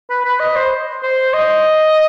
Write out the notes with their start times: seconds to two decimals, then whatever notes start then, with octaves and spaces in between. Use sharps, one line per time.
0.10 B4
0.24 B4
0.40 D#5
0.56 C5
1.03 C5
1.34 D#5